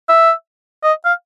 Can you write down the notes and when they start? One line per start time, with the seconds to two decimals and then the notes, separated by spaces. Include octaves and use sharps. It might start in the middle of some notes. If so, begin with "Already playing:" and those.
0.09 E5
0.83 D#5
1.05 F5